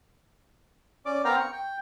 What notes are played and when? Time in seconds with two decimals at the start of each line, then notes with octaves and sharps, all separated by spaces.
1.06 C#4 D5 D6
1.24 B3 C4 A#4 F5 G5 A#5
1.40 C#6
1.52 G5